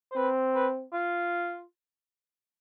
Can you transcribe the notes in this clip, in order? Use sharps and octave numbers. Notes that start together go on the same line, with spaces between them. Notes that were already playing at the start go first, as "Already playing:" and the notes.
C5
C4 B4
B4
F4